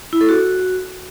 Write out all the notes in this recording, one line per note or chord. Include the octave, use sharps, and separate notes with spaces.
E4
A4
F#4